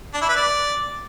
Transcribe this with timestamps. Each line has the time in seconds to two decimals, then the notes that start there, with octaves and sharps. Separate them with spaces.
0.14 D4
0.21 E4
0.29 B4
0.36 D5